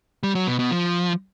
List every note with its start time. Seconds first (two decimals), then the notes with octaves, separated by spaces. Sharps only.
0.23 G3
0.35 F#3
0.47 B2
0.59 B2
0.71 F3